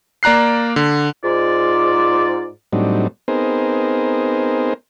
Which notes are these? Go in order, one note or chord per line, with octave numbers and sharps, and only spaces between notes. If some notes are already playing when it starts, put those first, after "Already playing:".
A#3 D5 A#5 F#6 C7
D3
G#2 F4 D5
A2 F#3 G3 C4 D4 D#4
B3 C4 D#4 G#4 A#4 C5